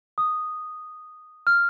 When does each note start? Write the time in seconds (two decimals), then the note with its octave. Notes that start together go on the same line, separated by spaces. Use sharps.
0.18 D#6
1.47 F6